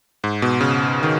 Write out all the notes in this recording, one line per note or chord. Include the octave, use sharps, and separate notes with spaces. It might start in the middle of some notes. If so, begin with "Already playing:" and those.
G#2
B2
C#3
D#3